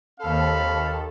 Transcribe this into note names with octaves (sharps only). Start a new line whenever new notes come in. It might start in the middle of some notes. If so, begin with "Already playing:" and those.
D#2 C4 A4 F5 B5